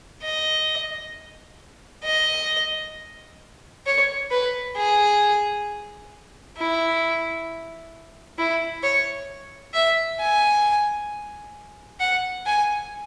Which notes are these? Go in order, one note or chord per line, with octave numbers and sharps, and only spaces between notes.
D#5
D#5
C#5
B4
G#4
E4
E4
C#5
E5
G#5
F#5
G#5